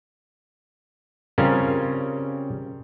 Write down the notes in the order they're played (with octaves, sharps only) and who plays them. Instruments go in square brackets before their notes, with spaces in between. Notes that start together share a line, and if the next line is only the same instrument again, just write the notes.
[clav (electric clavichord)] C#3 G3 C4 C#4 F4 A#4